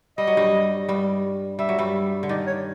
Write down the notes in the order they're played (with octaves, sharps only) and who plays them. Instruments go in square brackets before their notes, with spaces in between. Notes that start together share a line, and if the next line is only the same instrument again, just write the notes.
[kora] G3 [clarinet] D#5
[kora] F#3
G2 G3
G2 G3
[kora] G3 [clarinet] E5
[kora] F#3
G2 G3
D3
[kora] D#3 [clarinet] D5
[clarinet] C#5